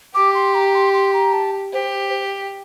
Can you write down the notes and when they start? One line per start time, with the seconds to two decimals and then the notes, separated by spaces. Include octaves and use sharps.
0.15 G4 D6
0.34 C6
0.55 A#5
0.75 C6
0.94 C6
1.14 A#5
1.33 A5
1.73 G4 C5